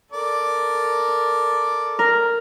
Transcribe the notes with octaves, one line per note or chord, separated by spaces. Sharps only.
A4 A#4 D5
A#4